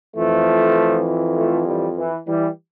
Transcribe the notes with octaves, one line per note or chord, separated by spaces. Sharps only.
F2 E3 F3 A3
F3 A3
E3 G3
E3
E3 G3